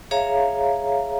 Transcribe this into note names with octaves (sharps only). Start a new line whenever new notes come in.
G#4 C#5 E5 F5 A#5